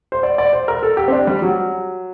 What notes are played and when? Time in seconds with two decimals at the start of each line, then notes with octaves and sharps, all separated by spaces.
0.12 C5
0.23 D5
0.38 D5
0.53 C5
0.68 A#4
0.83 A4
0.97 G4
1.08 C4
1.12 D4
1.27 G3
1.42 F#3